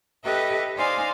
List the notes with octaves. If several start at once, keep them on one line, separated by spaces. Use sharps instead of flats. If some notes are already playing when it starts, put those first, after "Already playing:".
G4 A4 B4 D#5 E5
D#4 C5 D5 F5 G#5